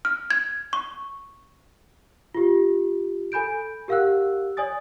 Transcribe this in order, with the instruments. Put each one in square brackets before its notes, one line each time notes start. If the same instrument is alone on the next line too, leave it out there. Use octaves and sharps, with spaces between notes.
[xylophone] F6
G#6
C#6
[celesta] F4 G4
A4 G#5 B5 G6 D7
G4 A#4 F5 F#5 E6 F#6
C#5 D5 G#5 D#6 A6